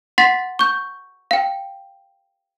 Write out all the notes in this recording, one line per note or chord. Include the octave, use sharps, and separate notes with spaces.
F#5 C6 A6 B6 C7
C#6 G6
F5 G5